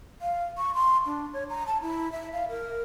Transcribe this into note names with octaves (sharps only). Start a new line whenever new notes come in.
F5
C#6
C6
D4
C#5
A#5
A5
E4
E5
F5
A#4